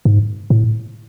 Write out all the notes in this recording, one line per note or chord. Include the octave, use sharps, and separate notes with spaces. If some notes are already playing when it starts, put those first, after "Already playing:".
G#2
A2